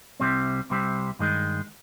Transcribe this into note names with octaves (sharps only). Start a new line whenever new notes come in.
C2 C3 G3 C4
C2 C3 G3 C4
G2 D#3 G#3